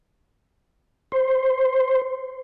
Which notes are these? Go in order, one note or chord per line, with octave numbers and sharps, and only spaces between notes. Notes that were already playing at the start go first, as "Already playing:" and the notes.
C5